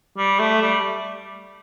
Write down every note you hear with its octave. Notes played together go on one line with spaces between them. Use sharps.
G3
A3
G3